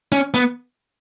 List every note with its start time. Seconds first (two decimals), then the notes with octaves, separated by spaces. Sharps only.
0.12 C#4
0.34 B3